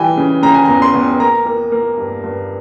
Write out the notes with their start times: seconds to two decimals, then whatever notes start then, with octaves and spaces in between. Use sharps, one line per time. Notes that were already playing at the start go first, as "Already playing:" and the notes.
Already playing: E3 G3 G5 G#5
0.17 C#3
0.42 C#3 A#5
0.54 G#5
0.65 E2 A#5
0.82 C6
0.94 E2
1.20 A#3 A#5
1.46 A#3
1.72 A#3
1.97 G2
2.23 G2